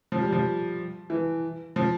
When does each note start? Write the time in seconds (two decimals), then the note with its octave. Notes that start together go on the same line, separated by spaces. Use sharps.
0.12 F3
0.22 G3
0.32 F3
1.10 E3
1.76 F3